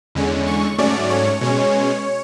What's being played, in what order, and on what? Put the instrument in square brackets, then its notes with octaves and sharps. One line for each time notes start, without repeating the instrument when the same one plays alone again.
[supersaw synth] E2 D3 G#3 C#4
C#6
G#2 F#3 A3 C#4 D5
C#5
B2 G#3 C#4